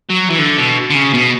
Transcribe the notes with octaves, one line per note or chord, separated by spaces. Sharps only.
F#3
E3
D3
B2
D3
C#3
B2